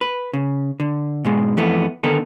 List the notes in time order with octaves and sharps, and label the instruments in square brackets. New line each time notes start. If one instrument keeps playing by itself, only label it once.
[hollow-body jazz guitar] B4
C#3
D3
G#2 B2 G#3
F2 E3 A3 B3
D3 D#3 B3 D#4 A4